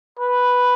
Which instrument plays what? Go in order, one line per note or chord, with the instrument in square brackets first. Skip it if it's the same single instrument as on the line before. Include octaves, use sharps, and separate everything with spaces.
[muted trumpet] B4